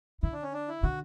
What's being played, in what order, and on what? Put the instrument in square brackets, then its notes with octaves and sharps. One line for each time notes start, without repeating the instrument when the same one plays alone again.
[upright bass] D3 [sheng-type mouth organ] E4
[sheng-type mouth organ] D4
C#4
D4
E4
[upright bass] D3 [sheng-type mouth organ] F#4